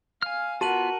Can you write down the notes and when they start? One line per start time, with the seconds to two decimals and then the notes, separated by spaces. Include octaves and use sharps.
0.22 F5 G#5 F6
0.61 B3 F4 F#4 A#4 F#5 A5 D#7 F#7